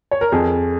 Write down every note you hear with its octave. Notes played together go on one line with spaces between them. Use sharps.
C#5
A#4
F2 G#4